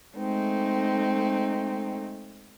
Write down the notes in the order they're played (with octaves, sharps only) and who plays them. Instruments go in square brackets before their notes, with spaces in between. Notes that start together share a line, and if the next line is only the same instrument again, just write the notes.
[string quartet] G#3 A3 C4 D#4